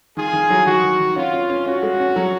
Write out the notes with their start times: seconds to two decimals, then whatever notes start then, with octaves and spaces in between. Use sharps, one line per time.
0.17 D#3 F4 G#4
0.33 D#3
0.50 F#3
0.66 D#3 F#4
0.84 D#3
1.00 D#3
1.16 C#4 F4
1.33 C#4
1.50 C#4
1.66 C#4 F#4
1.83 G#3
2.00 C#4
2.16 F#3